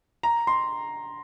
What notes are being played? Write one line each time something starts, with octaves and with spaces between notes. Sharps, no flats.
A#5
C6